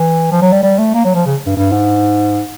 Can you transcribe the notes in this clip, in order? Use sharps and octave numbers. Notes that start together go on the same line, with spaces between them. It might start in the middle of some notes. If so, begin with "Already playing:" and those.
Already playing: E3
F3
F#3
G3
G3
A3
A#3
F#3
F3
C#3
G2
G2
G#2